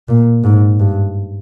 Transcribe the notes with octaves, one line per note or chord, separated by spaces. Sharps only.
A#2
G#2
G2